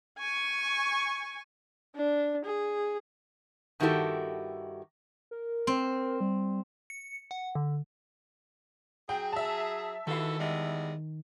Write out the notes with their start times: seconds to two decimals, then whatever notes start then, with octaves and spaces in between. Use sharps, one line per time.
0.19 G#5 C#6
1.96 D4
2.45 G#4
3.80 G2 D#3 E4 F#4 G4 A4
5.31 A#4
5.67 C4
6.21 G3
6.90 C#7
7.31 F#5
7.55 D3
9.09 F#3 G#4 G5
9.32 E5 A5
10.07 D#3 E3 F#4 A4 F5
10.38 E2 G3 G#3